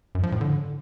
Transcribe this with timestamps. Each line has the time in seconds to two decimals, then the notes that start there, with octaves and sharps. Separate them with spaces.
0.15 F#2
0.23 F3
0.32 A2
0.41 D3